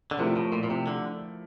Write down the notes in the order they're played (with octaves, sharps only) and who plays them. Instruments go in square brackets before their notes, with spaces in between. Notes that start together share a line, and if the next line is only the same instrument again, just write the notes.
[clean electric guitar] D3
[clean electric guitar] C3 [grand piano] F3 A3 E4 A#4
[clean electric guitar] A2
A#2
A#2
C3
D3